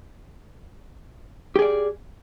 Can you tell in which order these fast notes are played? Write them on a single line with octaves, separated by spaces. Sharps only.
G4 G#4 D5